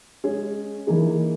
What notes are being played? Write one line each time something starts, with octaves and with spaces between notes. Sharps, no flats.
G#3 C#4 G#4
E3 A#3 D#4 G#4